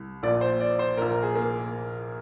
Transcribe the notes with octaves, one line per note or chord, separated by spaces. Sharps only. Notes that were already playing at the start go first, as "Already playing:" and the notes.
Already playing: C2
A#1 A#2 D5
C5
D5
C5
A#1 A#2 A#4
A#4
G#4
A#3